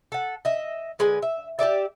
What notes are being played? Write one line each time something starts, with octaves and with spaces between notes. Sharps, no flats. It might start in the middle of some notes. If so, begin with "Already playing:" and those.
A4 F#5
D#5 E5
D3 G#3 B4 G#5
E5
G4 G#4 D5 E5